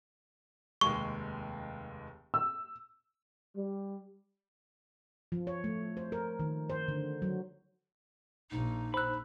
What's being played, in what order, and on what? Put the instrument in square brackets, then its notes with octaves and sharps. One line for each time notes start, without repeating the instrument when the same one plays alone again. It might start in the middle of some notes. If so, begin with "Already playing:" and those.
[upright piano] F1 D#2 G#3 [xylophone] C#6
[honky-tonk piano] E6
[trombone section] G3
[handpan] F3
C#5
A3
C5
A#4
D#3
C5
D3
F#3
[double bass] A#1 [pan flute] D#4
[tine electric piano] C5 F#6 [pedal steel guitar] B5 E6